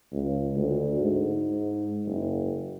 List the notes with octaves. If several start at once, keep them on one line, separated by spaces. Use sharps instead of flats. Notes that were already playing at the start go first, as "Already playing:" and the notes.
C#2
D2
G#2
F#1